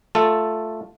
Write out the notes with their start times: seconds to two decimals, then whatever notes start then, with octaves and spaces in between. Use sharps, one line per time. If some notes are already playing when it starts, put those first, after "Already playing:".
0.15 A3 F4 A4